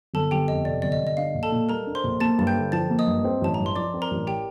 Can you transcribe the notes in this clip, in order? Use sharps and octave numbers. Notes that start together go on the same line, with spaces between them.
G1 A4 A5
G1 G4 G5
F2 D#5
C3 D5
G1 D5
D#5
G1
D#5
D4 F5
A#1
A4 A5
A#2
G3 A#4 A#5
D4
C5 C6
A#1
A#3 A5 A6
G2 A6
G5 G6
D3
F3 A5 A6
A#3
D#5 D#6
G2
C4
A1 A5
G2 A#5
C6
F3 D5 D6
C4
A#4 A#5
A1
G4 G5